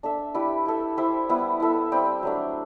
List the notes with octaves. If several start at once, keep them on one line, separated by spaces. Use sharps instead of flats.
D4 A4 E5
E4 G4 B4 D5
E4 A4 E5
E4 G4 C5 E5
G3 B3 E4 B4
E4 A4 E5
G3 C4 G4
F#3 A3 D4